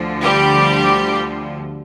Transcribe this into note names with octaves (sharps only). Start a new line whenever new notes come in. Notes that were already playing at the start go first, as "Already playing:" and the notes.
Already playing: D2 D3 F3
G3 G4